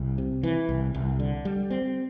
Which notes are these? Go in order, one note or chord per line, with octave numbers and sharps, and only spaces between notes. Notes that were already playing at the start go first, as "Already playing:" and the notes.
Already playing: C2
C3
E3
C2
C2
D3
G3
C4